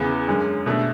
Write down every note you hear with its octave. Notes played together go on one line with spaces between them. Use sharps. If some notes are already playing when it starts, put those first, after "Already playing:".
Already playing: E2 C#3 E3 B3
F#2 D3 G#3 C#4
B2 A3 D4